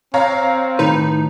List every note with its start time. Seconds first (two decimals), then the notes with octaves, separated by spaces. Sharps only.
0.14 C4 C#5 F5 A#5
0.79 A2 D#3 D#4 B4